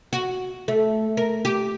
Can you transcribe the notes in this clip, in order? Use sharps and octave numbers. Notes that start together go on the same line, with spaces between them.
F#4
A3
A#4
G4